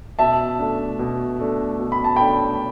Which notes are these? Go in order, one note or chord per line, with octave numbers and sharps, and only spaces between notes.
B2 E5 A5
A3 D4
B2
A3 D4
B2
B5
A5
A3 D4 G5 B5